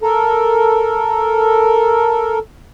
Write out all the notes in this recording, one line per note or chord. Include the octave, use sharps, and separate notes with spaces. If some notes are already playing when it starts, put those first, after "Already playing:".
A4 A#4